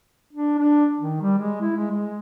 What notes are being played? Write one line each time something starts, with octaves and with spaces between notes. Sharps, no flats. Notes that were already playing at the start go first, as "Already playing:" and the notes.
D4
D4
D#3
G3
G#3
E4
G#3
G#3